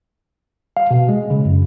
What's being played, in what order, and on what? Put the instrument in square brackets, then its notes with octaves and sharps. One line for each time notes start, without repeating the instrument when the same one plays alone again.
[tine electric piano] F5
B2
G#3
C#3
F#2